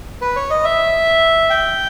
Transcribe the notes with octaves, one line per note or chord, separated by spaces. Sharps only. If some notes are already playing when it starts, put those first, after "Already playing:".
B4
C#5
D#5
E5
G5